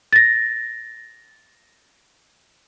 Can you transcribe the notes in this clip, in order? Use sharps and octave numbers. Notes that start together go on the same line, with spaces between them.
A6 A#6